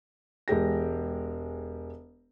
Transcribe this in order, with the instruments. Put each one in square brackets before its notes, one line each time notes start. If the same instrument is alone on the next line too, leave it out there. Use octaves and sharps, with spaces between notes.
[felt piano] E1 G#3 G4 A#6